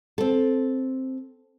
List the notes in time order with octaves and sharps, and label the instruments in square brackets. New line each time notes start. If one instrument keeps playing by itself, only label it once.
[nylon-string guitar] C4 A4